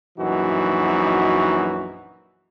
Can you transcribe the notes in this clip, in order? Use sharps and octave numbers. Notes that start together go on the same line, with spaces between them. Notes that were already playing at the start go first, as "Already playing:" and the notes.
A#1 F#2 E3 D#4 F#4